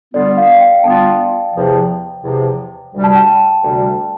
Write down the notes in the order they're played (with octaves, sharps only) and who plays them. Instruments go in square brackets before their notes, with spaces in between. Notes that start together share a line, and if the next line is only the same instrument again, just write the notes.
[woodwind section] D3 G3 B3 F4 [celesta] D5
[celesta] F5
G5
G5
[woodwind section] D3 G3 B3 F4 [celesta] A5
[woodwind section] E2 C3 F3 [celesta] G5
[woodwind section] E2 C3 F3
D2 C3 G3
[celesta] A5
G5
A5
[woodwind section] D2 C3 G3